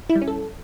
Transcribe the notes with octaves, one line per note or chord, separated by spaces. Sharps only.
E4
G3
C#4
A4